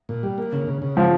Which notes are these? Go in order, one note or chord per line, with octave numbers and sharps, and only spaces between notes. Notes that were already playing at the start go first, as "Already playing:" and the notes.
A#2
G3
A#3
C#3
C#3
C#3
F3 C4